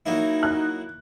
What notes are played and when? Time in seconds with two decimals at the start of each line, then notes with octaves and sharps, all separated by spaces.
0.06 F#3 A#3 D#4 E4
0.43 F#6